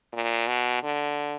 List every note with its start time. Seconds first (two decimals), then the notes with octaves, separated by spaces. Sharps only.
0.13 A#2
0.48 B2
0.83 D3